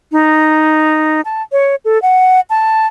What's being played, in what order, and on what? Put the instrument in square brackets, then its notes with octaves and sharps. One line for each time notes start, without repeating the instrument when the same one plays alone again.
[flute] D#4
A5
C#5
A4
F#5
A5